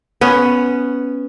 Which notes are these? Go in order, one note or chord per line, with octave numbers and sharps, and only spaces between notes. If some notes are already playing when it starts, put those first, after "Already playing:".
B3 C#4